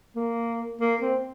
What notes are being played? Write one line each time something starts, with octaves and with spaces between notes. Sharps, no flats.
A#3
A#3
C4